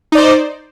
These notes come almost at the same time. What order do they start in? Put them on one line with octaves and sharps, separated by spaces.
D#4 D5 C5